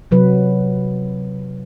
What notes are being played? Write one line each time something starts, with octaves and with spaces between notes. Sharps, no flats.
C3 F#3 B4